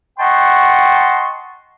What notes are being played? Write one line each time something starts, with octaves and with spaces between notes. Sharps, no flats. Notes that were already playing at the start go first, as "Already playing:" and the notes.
D#5 F#5 G5 A5 C6 C#6